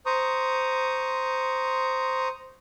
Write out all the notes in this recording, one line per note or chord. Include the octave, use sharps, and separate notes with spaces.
C5 A#5 C#6 D#6